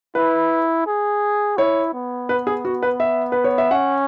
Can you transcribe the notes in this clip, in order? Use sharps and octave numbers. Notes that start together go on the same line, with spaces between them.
E4 B4
G#4
E4 C#5
B3
B4
G#4
F#4
B4
E5
B4
C#5
E5
C#4 F#5